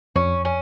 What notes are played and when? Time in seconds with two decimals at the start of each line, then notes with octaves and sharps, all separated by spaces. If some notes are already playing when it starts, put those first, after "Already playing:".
0.16 F2 C#4
0.45 C#4